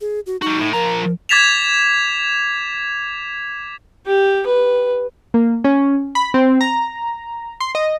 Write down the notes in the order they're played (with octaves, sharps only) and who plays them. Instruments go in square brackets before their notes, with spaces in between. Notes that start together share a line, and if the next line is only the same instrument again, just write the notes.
[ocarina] G#4
F#4
[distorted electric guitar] G3 F#4 [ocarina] D#4
[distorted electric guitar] A2
[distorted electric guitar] F3 A#5 [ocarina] A#4
[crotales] D6 G#6 A6 B6 E7 F7
[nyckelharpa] G4
B4
[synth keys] A#3
C#4
B5
C4
A#5
C6
D#5